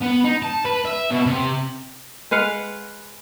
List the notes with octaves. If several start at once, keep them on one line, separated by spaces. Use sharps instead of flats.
B3
D#4
A5
B4
E5
B2
C3
G#3 B4 F5 F#5